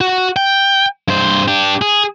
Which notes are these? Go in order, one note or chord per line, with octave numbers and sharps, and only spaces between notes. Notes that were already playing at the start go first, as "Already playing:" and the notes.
F#4
G5
G2 C5
D4 G4
G#4